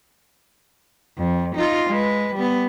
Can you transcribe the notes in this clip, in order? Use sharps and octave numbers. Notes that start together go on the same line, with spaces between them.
F2
D#4 F4
G#3 B4
G3 B3